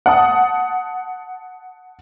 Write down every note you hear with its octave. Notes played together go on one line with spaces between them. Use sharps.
F#5 A5 D#6